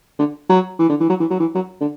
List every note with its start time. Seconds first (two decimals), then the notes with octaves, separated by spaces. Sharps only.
0.19 D3
0.49 F#3
0.79 E3
0.89 D3
1.00 E3
1.09 F#3
1.20 E3
1.30 F#3
1.40 E3
1.55 F#3
1.81 D3